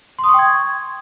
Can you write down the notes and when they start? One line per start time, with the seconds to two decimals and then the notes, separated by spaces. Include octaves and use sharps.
0.19 C6
0.24 D#6
0.29 C#6
0.34 G5
0.39 G#6